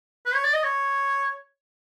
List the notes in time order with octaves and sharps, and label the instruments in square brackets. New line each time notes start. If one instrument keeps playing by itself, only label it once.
[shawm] B4
C#5
D5
D#5
C#5